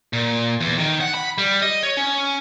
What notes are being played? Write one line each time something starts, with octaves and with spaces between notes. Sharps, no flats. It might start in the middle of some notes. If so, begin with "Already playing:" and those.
A#2
E2
D#3
F#5
B5
G3
D#5
C#5
C#4